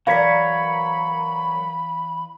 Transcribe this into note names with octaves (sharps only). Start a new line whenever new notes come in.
E3 F#3 A#4 C#5 D5 F5 B5 B6